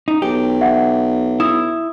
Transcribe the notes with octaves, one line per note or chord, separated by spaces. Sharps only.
D#4
B1 G4
E5 F#5
E4 D#6